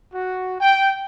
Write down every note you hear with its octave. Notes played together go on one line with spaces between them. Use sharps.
F#4
G5